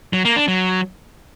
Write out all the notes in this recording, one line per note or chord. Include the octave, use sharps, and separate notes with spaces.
F#3
A#3
D4
F#3